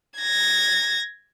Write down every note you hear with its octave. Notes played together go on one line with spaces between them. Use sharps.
G#6 A#6